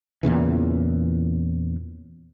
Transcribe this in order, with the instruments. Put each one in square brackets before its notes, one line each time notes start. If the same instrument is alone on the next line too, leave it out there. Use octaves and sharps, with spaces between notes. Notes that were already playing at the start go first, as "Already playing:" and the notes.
[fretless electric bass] E2 A#2 C#3 E3